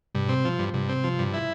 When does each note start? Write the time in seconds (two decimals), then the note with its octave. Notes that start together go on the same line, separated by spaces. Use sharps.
0.14 G2 C3
0.24 B2
0.29 C3 C4
0.45 F3
0.59 G2
0.74 G2 C3
0.89 C4
1.04 F3
1.19 G2
1.34 E4